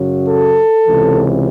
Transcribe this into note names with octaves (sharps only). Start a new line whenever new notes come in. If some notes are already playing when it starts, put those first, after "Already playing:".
Already playing: F#2 C#3 F#3
A4
C#2 C3 E3